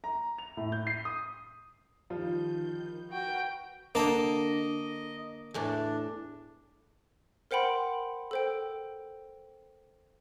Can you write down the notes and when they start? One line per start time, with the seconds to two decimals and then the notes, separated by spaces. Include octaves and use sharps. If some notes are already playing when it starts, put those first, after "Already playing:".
0.04 A#5
0.38 F7
0.57 A2
0.72 G6
0.87 C7
1.05 D#6
2.10 D#3 F3 G3 F4 G6
3.11 F#4 A#4 B4 G5
3.95 D3 A#3 D4 D#5 A5
5.54 E2 A2 E3 D4
7.51 A#4 C5 F#5 G5 B5 C6
8.31 A4 C5 G5